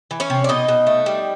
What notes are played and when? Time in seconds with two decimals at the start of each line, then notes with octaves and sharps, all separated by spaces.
0.11 E3
0.20 C#4 C#5
0.30 C3
0.44 D5
0.49 B2 D#4 D#5
0.68 B2
0.87 A3
1.06 G3